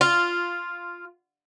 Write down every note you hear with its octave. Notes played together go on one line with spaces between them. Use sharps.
F4